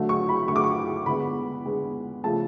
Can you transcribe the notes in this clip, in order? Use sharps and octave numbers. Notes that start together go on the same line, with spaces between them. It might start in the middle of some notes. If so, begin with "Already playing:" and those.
Already playing: D3 F#3 A3
C#6
B5
D3 F#3 A3 C#6
D6
C#6
D3 G#3 B3 B5
D3 G#3 B3
C#3 F3 A3 A5